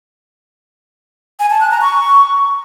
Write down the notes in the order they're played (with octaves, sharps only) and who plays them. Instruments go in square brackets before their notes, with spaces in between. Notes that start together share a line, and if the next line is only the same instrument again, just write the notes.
[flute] G#5
A5
F#6
A#5
C#6